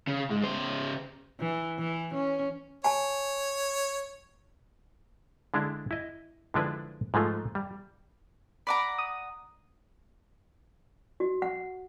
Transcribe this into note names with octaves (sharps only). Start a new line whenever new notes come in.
C#3
G#2
C#3 C5
E3
E3
C#4
C#5 G#5 A5
D3 G#3 D4 E4
E4 D#5
D3 F3 G#3 D4 E4 B4
G#2 F3 G#3 A3 F4
G3
D5 F#5 A#5 B5 D6
D#6
F#4
F#5